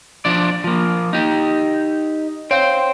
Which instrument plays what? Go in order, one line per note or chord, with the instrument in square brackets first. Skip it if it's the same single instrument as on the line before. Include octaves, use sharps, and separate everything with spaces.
[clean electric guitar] F3 D4 D5
F3 A#3
D#4 G4
[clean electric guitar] C5 G5 [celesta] C#5 F5 G6